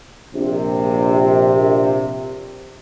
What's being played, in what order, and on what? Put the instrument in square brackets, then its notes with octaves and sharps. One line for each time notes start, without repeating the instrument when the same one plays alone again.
[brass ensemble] A#1 C3